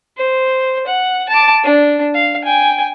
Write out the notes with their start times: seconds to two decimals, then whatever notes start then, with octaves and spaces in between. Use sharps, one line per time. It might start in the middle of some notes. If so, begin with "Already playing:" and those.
0.17 C5
0.86 F#5
1.29 A5 D6
1.63 D4
2.15 F5
2.44 G5 G#5